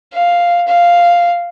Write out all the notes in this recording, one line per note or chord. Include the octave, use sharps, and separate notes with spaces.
F5
F5